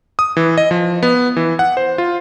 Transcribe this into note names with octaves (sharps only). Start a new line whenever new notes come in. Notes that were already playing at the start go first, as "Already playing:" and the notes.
D#6
E3
D#5
F3
B3
E3
F#5
C5
F4